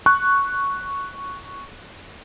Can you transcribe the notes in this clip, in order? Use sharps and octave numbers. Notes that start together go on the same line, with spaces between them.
C#6 F#6